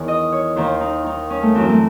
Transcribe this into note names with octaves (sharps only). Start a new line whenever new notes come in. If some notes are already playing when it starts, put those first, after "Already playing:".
Already playing: E2 D#3 C#5
D#5
C#5
D#2 D#3 C5
D#4
D#4
C#4
A3
F#2 E3 C4
A3